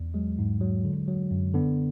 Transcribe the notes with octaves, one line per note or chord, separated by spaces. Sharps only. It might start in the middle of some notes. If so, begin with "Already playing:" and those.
Already playing: E2
F#3 G#3
G#2
F#3
D3
F#3
F#2
D3 B3